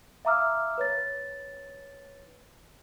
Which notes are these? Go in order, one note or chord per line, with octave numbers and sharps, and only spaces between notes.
E5 F5 A#5 D6 E6 F6
B4 C#5 A6